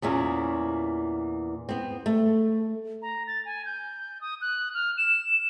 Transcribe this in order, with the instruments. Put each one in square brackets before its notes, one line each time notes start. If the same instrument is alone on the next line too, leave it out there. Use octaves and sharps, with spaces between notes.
[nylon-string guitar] E2 A#2 E3 C#4
B3 C4
A3
[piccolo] A#5
A6
G#5
G6
D#6
F#6
F6
E7